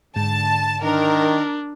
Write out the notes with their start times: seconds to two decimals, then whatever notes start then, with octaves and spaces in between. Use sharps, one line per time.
0.16 G#2 D3 A5
0.83 D#3 D4 A#4